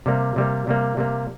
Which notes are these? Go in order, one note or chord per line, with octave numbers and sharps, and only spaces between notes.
C3 G3 A#3
C3 G3 A#3
C3 G3 A#3
C3 G3 A#3